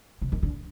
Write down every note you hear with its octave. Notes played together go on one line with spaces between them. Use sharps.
C3
D#3
D3